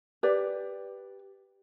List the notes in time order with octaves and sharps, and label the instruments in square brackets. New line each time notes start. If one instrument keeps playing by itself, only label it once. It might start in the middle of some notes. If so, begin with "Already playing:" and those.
[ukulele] G4 B4 D5